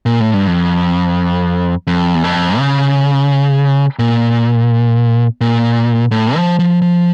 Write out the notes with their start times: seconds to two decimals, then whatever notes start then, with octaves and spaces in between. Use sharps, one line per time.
0.06 A#2
0.20 A2
0.34 G2
0.47 F2
1.87 F2
2.15 E2
2.24 F2
2.58 C#3
3.99 A#2
5.41 A#2
6.11 A2
6.36 F3
6.59 F3
6.82 F3